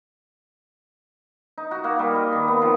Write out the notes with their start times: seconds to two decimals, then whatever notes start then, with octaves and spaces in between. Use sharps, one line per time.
1.58 D#4
1.71 F#4
1.84 A#3
1.99 G3
2.15 D#5
2.32 D#3
2.48 B3
2.62 F3